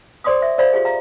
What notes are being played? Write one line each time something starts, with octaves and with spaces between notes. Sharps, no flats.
A#4 C5 D5 C6 D6 D#6
E5
A#4 C5 D5 F5 B5
F4 G4 G#4
F5 A#5